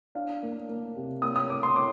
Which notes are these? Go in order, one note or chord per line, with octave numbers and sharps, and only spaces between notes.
D4 F5
A#3
A#3
C3
A#3 D#6
D#6
A2 D6
C6
A2 D6